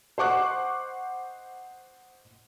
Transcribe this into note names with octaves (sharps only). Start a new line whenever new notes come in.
C5 D#5 F#5 C#6 D6 F#6